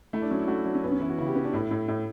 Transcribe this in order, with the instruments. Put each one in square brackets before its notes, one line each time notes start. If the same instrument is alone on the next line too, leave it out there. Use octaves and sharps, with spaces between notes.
[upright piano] A3 [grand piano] E4
[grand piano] D4
[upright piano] F#3 [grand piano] C#4
[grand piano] E4
[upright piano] A3 [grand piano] F#4
[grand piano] E4
[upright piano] F#3 [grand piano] D4
[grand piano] C#4
[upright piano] F#2 [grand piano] B3
[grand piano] C#4
[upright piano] E3 [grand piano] E4
[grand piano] F#4
[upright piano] C#3 [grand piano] E4
[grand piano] G4
[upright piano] B3 [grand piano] C#4
[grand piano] D4
[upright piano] A2 [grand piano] E4
[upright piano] A2
A2